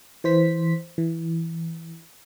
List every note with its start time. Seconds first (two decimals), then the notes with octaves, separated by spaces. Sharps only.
0.24 E3 C5 B6
0.98 E3